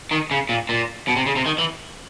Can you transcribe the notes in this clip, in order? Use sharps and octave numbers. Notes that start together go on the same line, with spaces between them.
D#3
C#3
A#2
A#2
B2
C3
C#3
C3
D#3
E3